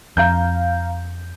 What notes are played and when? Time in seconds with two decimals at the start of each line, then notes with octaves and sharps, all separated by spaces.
0.17 F2 F5 A#5 G6